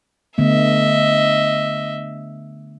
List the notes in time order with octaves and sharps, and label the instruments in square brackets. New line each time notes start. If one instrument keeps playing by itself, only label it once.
[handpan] D3 A3 B3 [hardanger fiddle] D#5 E5